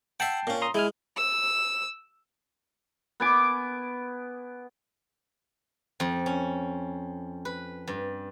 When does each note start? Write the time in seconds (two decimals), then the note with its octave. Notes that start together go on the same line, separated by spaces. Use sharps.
0.20 E5 F#5 G5 A5 C7
0.47 A#2 C#4
0.62 A#5 C6 D#6
0.75 G#3 E4 G#5 F6
1.17 E6
3.20 B3 G#5 D6
6.00 F2
6.26 C#4
7.45 B4
7.88 G2